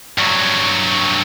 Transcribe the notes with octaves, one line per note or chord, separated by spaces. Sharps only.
G2 F#3